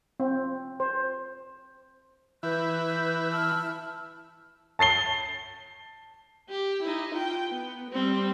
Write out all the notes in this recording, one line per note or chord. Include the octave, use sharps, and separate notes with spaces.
C4
C5
E3 E4 B4 F#6 G6
A5 E6 F6
A5 A6 C7 G7
G4
D#4 E4
F4 G5
B3
G3 C4